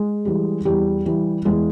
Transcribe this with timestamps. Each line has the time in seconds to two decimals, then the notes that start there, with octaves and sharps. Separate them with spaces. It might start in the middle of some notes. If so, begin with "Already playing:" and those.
Already playing: G#3 G#4
0.25 E3 G3
0.65 E2 G3 G4
1.05 E3 G3
1.45 E2 G#3 G#4